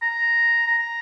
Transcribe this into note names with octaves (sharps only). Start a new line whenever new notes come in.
A#5
A#5